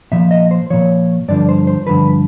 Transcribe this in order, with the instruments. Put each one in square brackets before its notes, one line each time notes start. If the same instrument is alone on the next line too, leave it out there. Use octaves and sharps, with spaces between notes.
[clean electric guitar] A#2 F3 E5
D#5
C5
A#2 F3 C#5
G2 D3 F3 D5
C5
C5
G2 D3 F3 B4